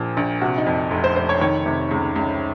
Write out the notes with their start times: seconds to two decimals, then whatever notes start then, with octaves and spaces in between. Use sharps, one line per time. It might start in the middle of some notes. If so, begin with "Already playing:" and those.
Already playing: A#1 A#2 F3
0.17 A#1
0.41 C3 F#4
0.58 D#4
0.66 F2
0.91 F1
1.04 C5
1.16 F1 C5
1.29 C#5
1.41 D#3 C#5
1.66 C3
1.91 C#2
2.16 C#2